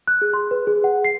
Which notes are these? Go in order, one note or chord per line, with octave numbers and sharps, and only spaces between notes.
F#6
G#4
C6
B4
G#4
F#5
C7